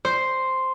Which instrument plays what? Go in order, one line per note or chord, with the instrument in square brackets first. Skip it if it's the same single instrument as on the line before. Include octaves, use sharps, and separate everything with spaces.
[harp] C5